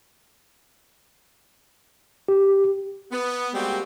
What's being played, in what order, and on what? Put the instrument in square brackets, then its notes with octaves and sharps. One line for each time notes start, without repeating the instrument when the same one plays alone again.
[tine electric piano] G4
[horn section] B3
G3 G#3 A#3 C4 F#4 G4